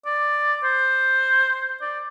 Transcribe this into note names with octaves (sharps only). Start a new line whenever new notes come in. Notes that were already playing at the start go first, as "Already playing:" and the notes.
D5
C5
D5